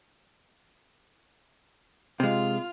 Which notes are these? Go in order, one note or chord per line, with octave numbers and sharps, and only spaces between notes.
C3 G#3 F4 F6